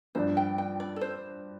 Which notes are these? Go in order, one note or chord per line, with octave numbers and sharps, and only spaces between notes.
G2 F3 D4 C5
G5
G5
D5
A4
C5